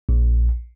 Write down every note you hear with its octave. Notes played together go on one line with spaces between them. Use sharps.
A#1